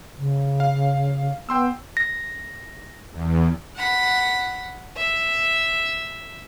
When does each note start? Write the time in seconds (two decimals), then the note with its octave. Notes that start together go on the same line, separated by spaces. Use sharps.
0.17 C#3
0.60 F5
1.49 B3 G5 C6 E6
1.97 A#6
3.12 E2
3.76 F#5 B5
4.97 E5